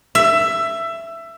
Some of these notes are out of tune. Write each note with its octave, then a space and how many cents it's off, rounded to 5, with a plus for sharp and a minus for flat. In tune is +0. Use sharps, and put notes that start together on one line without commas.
E5 +15